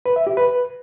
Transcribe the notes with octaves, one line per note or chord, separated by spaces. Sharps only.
B4
E5
G4
B4